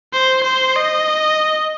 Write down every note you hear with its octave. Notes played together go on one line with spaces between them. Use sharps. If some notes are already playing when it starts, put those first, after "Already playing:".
C5
C5
D#5